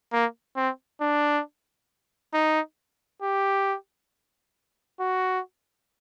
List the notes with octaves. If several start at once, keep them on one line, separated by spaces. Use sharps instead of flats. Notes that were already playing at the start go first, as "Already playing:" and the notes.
A#3
C4
D4
D#4
G4
F#4